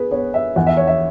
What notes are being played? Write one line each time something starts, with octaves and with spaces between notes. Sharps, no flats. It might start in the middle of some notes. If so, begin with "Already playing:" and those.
Already playing: B3 G#4 B4
B3 C#5
E5
E2 F#5
E5
C#5
E5